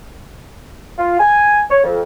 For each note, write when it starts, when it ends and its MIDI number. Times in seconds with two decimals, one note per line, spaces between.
0.98 1.18 65
1.19 1.60 80
1.70 1.80 73
1.84 2.00 41